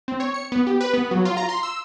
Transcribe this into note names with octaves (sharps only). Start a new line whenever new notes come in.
C4
C#5
C#7
B3
G4
B4
B3
F#3
F4
A#5
C6
E6